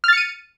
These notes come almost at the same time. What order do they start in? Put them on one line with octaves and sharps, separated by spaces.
F6 A6 C#7 D#7